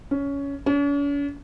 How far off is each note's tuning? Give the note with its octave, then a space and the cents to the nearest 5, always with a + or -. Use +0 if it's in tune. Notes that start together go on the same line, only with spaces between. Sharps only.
C#4 +15
C#4 +45